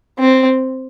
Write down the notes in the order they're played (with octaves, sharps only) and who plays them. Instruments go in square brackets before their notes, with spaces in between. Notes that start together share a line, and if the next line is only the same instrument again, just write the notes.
[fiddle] C4